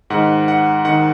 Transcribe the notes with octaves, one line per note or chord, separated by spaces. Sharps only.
G#2 D#3 F#5
F#5
D#3 F#5